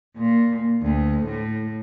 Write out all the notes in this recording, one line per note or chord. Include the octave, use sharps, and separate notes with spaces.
A#2
D2
A2